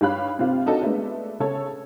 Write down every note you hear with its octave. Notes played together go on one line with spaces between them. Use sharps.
G2 G3 C#5 F5 B5 F#6
C3 C4 F4 G4 F5
D4 D#4 F#4 A4
G#3 A3 B3 D4
C#3 A4 C#5